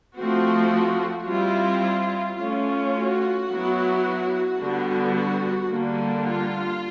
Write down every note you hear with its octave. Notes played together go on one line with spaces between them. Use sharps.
F3 A3 C4 F#4
G3 C4 E4 F4
A3 C#4 F4
F#4
F#3 B3 E4
D3 G3 B3
F#4
D3 G3 A#3
F4